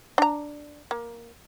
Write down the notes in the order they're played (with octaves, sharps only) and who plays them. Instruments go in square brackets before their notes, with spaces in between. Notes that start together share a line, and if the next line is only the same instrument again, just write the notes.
[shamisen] D4 A#5
A#3